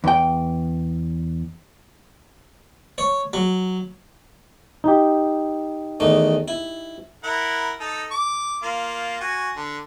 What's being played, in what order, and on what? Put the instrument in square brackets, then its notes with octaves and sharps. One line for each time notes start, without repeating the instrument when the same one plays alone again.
[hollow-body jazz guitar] E2 G5
[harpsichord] C#5
F#3
[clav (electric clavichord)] D#4 G4
[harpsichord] E2 D#3 A3
E4
[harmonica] E4 A#4 F#5
D#4 A4
D6
A#3 F4
F#4 G#5
D3